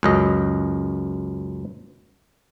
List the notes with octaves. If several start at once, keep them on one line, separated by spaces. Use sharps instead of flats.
C#2 F#2 D#5